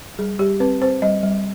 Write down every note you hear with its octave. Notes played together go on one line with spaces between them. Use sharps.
G3 G#4
G3 G4
C4 B4
C4 C5
G3 D#5
G3